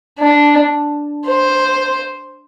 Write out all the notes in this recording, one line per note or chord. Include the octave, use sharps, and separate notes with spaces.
D4
C5